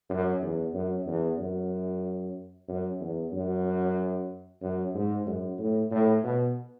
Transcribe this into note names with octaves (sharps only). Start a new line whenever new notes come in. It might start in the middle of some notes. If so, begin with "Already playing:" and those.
F#2
E2
F#2
E2
F#2
F#2
E2
F#2
F#2
G#2
F#2
A2
A2
B2